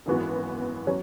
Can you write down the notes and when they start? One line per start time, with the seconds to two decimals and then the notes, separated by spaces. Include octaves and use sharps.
0.06 G#1 F#2 E3 B3 F#4
0.87 F#3 C#4